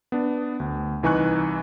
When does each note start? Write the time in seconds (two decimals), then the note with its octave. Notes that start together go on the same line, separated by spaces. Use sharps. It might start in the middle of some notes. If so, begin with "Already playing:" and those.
0.12 B3 D4
0.60 D2
1.03 C2 E3 D#4 G#5 C#6 F#6